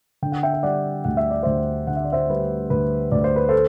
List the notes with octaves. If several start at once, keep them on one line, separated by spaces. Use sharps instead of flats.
D3 G5
F#5
E5 G5
G5
G3 D5 F#5
D2 F#5
E5
D5
D2 C5 E5
D3 F#5
E5
D5
C5 E5
G3 B4
D2 B4
D2 D5
C5
B4
A4 C5